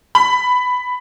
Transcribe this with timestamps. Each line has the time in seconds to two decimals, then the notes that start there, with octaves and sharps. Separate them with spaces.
0.15 B5